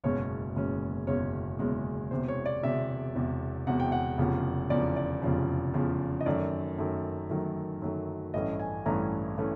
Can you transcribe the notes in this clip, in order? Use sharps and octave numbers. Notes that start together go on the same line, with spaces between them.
F#1 E2 B2 G#3 C#4 C#5
F#1 E2 B2 G#3 C#4
F#1 E2 B2 G#3 C#4 C#5
F#1 E2 B2 G#3 C#4
E1 E2 C3 C5
C#5
D5
E1 E2 C3 E5
E1 E2 C3
E1 E2 C3 F#5
G5
F#5
F1 E2 C#3 F3
F1 E2 C#3 F3 D5
D5
F1 E2 C#3 F3
F1 E2 C#3 F3
D#5
F#2 D#3 F#3 A3 D5
F#2 D#3 F#3 A3
F#2 D#3 F#3 A3
F#2 D#3 F#3 A3
A1 G2 E3 A3 C#4 D#5
G#5
A1 G2 E3 A3 C#4 A#5
E3 A3 C#4